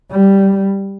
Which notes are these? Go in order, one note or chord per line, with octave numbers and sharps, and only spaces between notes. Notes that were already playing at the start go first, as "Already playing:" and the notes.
G3